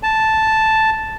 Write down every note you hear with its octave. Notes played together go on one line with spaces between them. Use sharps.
A5